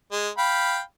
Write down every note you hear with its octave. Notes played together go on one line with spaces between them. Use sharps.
G#3
F5 G5 B5